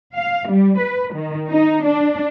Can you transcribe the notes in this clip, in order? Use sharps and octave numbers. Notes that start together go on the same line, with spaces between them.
F5
G3
B4
D#3
D#4
D4